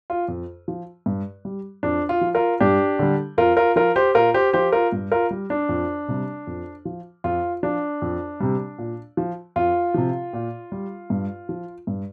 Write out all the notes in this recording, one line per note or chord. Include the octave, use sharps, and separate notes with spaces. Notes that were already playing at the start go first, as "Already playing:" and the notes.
F4
F2
F3
G2
G3
F2 D4
F4
F3
F4 A#4
G2 D4 G4
D3 G3
F2 F4 A#4
F4 A#4
F3 F4 A#4
G4 C5
A#2 F4 A#4
G4 C5
F3 G4 C5
F4 A#4
G2
F4 A#4
G3
D4
F2
C3 G3
F2
F3
F2 F4
F3 D4
F2
C3 G3
A#2
F3
F2 F4
C3 F3
A#2
G3
G2
F3
G2